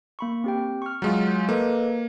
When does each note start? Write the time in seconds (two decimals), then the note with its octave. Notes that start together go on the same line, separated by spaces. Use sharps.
0.19 A#3 B5 C#6
0.44 C4 G4 G5
0.82 C#6 F6
1.02 F#3 G#3 F4
1.27 G6
1.49 A#3 A4 B4 D#5